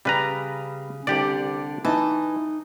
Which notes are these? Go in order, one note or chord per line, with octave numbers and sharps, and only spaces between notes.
C#3 G3 B4 A#5
C2 D3 G4 D5
E3 D#4 A5